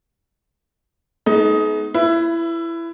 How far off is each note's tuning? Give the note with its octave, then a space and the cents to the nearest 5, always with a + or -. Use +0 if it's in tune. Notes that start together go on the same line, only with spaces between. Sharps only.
G#3 +45 B3 +15 D#4 +10
E4 +20 B4 +0